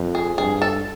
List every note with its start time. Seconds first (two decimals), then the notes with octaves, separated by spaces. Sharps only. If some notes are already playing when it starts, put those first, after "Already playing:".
Already playing: F2
0.15 G#4
0.38 G2 G#4
0.62 A4